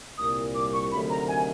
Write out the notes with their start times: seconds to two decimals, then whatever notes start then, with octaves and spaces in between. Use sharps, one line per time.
0.17 C2 A#2 G3 D#6
0.55 D6
0.73 C#6
0.92 D2 C3 D#3 F#3 A3 B5
1.10 A#5
1.28 G#5